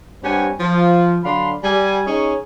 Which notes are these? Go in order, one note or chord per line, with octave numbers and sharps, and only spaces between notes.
G2 C4 G4 C#5 F#5 G#5
F3
D3 F#3 D4 F5 B5 C6
G3 G#5
C#4 D#4 G#4 C#5